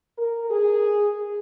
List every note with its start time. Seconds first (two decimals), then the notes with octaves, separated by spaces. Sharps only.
0.18 A#4
0.51 G#4